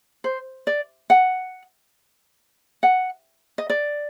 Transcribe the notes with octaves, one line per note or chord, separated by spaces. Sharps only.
C5
D5
F#5
F#5
D#5
D5